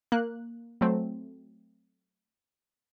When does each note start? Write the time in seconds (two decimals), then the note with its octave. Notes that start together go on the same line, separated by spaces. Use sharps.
0.12 A#3 F#6
0.81 F#3 A3 C4